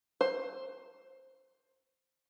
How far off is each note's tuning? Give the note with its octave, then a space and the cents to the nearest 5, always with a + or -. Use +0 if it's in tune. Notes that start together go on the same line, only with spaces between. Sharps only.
C5 +10